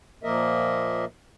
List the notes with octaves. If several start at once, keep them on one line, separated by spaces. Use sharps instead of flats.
A#2 F3 A#3 A#4 D#5 E5